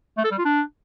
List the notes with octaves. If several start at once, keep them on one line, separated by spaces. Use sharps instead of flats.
A3
A4
G3
F4
D4